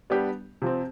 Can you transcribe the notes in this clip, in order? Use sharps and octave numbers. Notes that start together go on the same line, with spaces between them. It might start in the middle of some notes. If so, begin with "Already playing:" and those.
G3 B3 D4 G4
C3 F3 C4